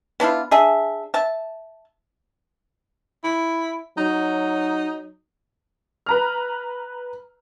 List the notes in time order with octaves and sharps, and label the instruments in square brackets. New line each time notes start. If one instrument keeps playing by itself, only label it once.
[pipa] B3 D4 E4 F4
D4 G#4 E5
E5 A5
[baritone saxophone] E4
[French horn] F#3 [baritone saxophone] D#4
[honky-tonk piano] B4 A#5 F6